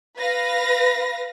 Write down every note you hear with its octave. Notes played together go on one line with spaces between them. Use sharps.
B4 F5 A#6